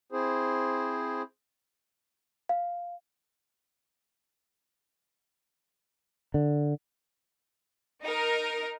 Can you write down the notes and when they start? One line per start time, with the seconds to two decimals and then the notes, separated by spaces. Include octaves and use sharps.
0.12 C4 E4 G#4 C5
2.49 F5
6.34 D3
8.02 D#4 A#4